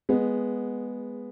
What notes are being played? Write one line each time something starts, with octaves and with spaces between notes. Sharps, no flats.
G#3 B3